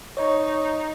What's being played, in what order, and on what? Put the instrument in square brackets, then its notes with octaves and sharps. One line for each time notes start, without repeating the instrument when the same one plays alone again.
[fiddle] D#4 [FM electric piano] C#5 D#5 C#6